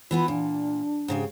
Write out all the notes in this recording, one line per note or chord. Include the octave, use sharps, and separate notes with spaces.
E3 B3 E4 F4
A#2 D4
G#2 C#3 G4